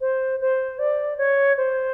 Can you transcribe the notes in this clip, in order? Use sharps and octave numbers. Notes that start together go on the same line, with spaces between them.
C5
C5
D5
C#5
C5